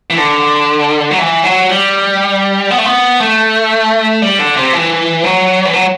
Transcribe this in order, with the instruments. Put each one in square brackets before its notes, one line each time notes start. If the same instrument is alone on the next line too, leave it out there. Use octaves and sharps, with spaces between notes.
[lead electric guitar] E3
D3
F#3
E3
F#3
G3
B3
A3
B3
A3
G3
D3
C3
E3
F#3
E3
F#3